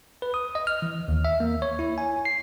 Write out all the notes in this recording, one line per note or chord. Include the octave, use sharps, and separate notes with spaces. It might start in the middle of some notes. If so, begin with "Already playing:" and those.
B4
D#6
D#5
F6
E3
D#2
E5
A#3
C#5
E4
G#5
C7